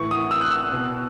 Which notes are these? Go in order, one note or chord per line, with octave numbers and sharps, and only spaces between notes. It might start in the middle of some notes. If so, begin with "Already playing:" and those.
Already playing: A2 E3 C#6
D#6
E6
F#6
E6
B2